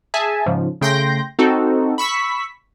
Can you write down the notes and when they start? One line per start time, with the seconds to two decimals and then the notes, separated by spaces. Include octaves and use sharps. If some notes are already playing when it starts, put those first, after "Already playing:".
0.14 G#4 E5 G#5 A5
0.46 G#2 C#3 F3
0.81 C#3 A3 G5 C6 G6 A#6
1.39 C4 D#4 F#4 A4
1.98 B5 C#6 E6 B6